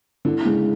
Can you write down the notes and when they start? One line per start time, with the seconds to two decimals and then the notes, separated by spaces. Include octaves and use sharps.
0.25 D3 E4
0.45 C#3 G#3